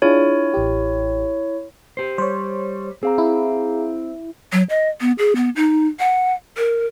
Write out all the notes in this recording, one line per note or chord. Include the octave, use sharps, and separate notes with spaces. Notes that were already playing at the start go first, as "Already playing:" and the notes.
D4 E4 F4 G#4 C#5
A1 G4
G4 C5
G3 C5 C#5
C4 G#4 F5 A#5
E4
F#3
D#5
B3
G#4
B3
D#4
F#5
A#4